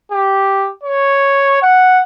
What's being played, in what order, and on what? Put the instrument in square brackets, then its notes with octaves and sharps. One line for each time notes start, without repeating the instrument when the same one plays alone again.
[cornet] G4
C#5
F#5